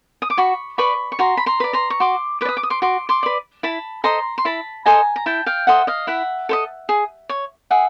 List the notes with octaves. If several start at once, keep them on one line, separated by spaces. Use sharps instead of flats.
D#6
D6
F#4 B5 C#6
B4 D5 B5 C#6
C#6
F#4 A#5 C6
B5
A#5 C6
B4 D5
A#5 C6
C#6
F#4 C6 D6
B4 D5 D6
D#6
D6
D#6
C6 D6
F#4 C6 D6
C6 D6
B4 D5
E4 A5 B5
A4 C5 D#5 A#5 C6
C6
E4 A5 B5
A4 C5 D#5 G#5 A#5
A#5
E4 G5 A5
F5 G5
A4 C5 D#5 E5 F#5
D#5 F5
E4 E5 F#5
A4 C5 D#5
G#4
C#5
G#4 E5 F#5